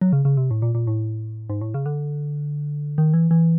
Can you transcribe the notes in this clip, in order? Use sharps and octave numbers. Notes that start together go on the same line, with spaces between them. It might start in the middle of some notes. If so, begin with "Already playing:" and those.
F#3
C#3
C#3
C3
A2
A#2
A#2
A2
G#2
A2
C#3
D3
D#3
E3
E3